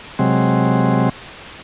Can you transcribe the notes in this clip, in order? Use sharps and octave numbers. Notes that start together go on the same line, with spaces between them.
C3 F#3 G#3 C4